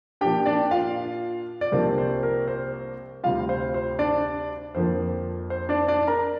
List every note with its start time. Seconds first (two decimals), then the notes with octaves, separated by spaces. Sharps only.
0.21 A#2 F3 D4 G4 G5
0.46 D4 D5
0.71 F4 F5
1.61 D5
1.72 C2 C3 F3 A#3 D4 C5
1.98 C5
2.23 A#4
2.48 C5
3.24 D2 C3 G3 F4 F5
3.49 C5
3.74 C5
3.99 D4 D5
4.75 F2 D3 F3 A#3 C5
5.50 C5
5.69 D4 D5
5.88 D4 D5
6.07 A#4 A#5